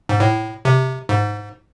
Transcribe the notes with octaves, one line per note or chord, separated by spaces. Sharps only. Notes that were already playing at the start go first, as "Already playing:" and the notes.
G#2
A2
C3
G#2